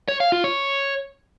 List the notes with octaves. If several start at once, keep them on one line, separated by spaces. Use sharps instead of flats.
C#5
F5
F4
C#5